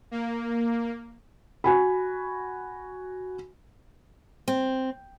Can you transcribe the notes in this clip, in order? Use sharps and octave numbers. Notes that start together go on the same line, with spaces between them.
A#3
F#4 G#5 B5
C4